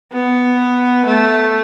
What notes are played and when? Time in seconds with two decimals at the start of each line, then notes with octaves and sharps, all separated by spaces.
0.12 B3
1.05 A3